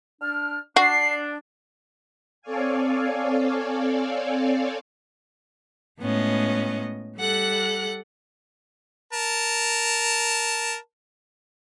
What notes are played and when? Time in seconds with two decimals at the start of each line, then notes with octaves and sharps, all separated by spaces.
0.21 D4 F6
0.76 D4 F#4 C7
2.42 C4 A4 C#5 D5 F5 G#5
6.00 A2 G#3 B3 C#4 D#5
7.18 G3 A4 F#5 F#6
9.13 A#4 A5